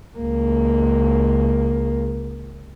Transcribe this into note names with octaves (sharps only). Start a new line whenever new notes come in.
C#2 A#3